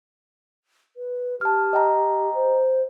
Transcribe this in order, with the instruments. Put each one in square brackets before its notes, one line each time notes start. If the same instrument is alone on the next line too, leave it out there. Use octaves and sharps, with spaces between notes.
[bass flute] B4
[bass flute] G4 [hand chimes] A5 F6
[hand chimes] D#5 G5 A#5
[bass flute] C5